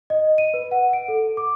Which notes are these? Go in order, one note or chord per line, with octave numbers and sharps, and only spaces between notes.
D#5
D#7
B4
F#5
D7
A4
D6